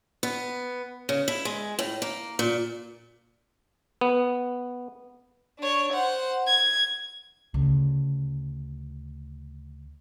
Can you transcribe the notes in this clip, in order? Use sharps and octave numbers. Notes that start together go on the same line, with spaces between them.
B3
C#3
E4
G#3
A2
A#3
A#2
B3
D4 C#5
C5 F#5
G#6
D2 C#3